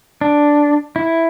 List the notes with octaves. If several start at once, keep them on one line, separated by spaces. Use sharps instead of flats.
D4
E4